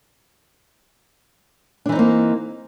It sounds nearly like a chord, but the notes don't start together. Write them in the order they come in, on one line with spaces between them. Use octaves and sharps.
D4 E3 D#4 C4 A#3